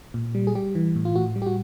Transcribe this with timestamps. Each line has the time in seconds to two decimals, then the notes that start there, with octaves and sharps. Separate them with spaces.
0.14 A#2
0.35 G3
0.47 G#4
0.55 G3 G4
0.75 E3
0.96 A2
1.05 F4
1.15 A2 F#4
1.36 G3
1.42 G4
1.46 F#4